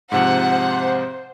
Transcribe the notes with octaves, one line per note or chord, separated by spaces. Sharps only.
G#2 C3 F3 C5 F#5